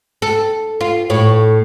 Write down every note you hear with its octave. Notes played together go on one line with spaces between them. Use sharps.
A4
F4
A2 C#5